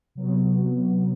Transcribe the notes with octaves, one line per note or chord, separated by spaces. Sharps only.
C3 F#3 B3